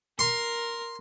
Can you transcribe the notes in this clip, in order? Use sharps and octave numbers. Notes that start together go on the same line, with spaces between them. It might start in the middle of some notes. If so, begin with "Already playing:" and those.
A#4 C6